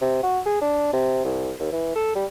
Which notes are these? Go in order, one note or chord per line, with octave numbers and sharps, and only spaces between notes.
C3
F#4
G#4
D4
C3
C2
D#2
E3
A4
G3